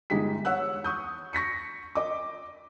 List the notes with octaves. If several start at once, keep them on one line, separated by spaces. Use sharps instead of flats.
G1 G#3 D#4 G4 G#4 B6
C#5 F#5 E6 F#6
C#6 D#6 G6
C#6 A#6 B6 C#7
D#5 D6